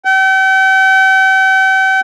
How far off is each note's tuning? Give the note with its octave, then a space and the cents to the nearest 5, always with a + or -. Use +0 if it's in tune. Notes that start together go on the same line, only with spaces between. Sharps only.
G5 -40